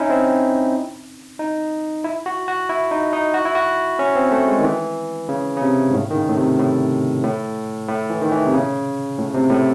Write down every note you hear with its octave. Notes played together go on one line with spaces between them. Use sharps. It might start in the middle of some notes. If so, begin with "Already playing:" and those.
Already playing: C#4 D#4 E4
C4
D#4
E4
F#4
F#4
E4
D#4
D#4
F#4
E4
F#4
C#4
C4
A3
G#3
D#3
E3
C#3
C#3
C3
G#2
A2
D#3
C#3
A2
C3
A2
A2
A2
E3
D#3
E3
C3
C#3
A2
C3
A2